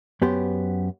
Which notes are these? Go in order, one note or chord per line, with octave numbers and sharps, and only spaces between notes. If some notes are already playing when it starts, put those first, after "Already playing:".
F#2 B3 G4 C5